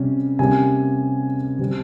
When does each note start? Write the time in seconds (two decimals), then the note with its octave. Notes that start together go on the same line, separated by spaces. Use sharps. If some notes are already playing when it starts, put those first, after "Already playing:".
Already playing: C3 G3 C#4
0.39 C3 G3 A#3 C#4 G#5
1.59 C3 G3 C4